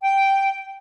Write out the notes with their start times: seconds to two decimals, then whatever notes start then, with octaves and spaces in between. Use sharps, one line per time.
0.02 G5